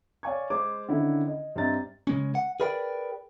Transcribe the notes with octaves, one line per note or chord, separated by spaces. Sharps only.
C#5 D5 F5 G#5 C#6 G#6
G#3 C5 D6 G#6
D3 D#3 C#4 E4
D#5
G2 C4 D#5 E5 A#5 A6
C#3 G#3 C#4
F#5
G#4 A#4 B4 D5 F5 G5